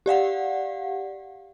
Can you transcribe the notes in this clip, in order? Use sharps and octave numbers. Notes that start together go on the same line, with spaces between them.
G4 D5 F5 F#5